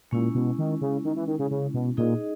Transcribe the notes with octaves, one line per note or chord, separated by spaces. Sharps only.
A#2 G#3 C#4 E4
B2
D#3
C#3
D#3
E3
D#3
C#3
C#3
B2
A#2 D#4 G#4 D#5